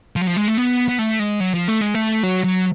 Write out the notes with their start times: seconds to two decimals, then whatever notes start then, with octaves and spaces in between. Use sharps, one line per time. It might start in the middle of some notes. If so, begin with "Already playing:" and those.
0.16 F3
0.21 F#3
0.27 F3
0.37 G#3
0.48 A3
0.58 B3
0.89 B3
0.99 A3
1.19 G#3
1.40 F#3
1.54 F3
1.68 A3
1.81 G#3
1.94 A3
2.23 F#3
2.44 F#3